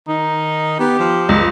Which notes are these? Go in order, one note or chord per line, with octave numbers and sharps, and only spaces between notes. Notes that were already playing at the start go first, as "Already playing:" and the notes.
D#3 D#4
B3 G4
F3
C#2